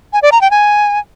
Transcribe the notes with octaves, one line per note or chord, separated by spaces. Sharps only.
G#5
D5
A#5
G5
G#5